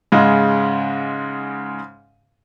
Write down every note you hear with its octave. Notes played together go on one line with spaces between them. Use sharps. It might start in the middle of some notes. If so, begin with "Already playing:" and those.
G#2 C#3 G#3